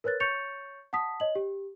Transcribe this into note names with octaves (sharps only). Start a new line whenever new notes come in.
A#4 B4 C#5 F#6 A6
C#5 C#6 G6 A6 C#7 F7
F#5 A5 D#6 B6
C#5 D#5 F#7
G4